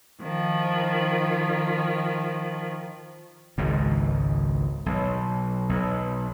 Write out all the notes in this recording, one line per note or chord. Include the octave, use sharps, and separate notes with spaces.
D#3 F3
G#1 C#2 G#2
B1
B1